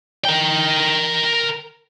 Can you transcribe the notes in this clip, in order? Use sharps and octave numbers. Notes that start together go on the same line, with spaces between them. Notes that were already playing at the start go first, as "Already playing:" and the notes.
A#4 G5